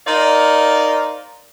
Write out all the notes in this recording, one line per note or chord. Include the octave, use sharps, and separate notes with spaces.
D#4 A#4 C5 D5 F5